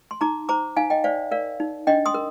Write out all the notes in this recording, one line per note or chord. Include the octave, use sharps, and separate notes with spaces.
C6
D#4 A#5 D6
C5 A#5 D6
D#4 F5 G#5
D#5 G5
C5 D5 F5
A#4 D5 F5
D#4
D4 D#5 G5
C6 D#6
A#4